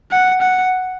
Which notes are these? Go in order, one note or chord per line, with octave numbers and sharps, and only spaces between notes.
F#5
F#5